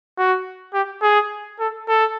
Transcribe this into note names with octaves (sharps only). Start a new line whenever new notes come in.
F#4
G4
G#4
A4
A4